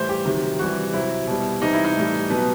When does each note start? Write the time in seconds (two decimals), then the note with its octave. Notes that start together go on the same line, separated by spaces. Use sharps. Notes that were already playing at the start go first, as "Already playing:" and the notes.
Already playing: A2 E3 G3 C5
0.09 G4
0.25 C3 D#3 F#3
0.59 C3 E3 G3 F#4
0.93 C3 F#3 E4
1.27 B2 G3
1.61 C3 E3 G3 D#4
1.73 E4
1.85 D#4
1.96 A2 E3 G3
2.30 B2 F#3 B3